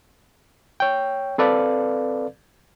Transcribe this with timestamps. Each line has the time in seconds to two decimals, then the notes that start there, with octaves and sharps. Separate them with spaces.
0.80 C#5 G5
1.38 C4 A4 B4 D5 F5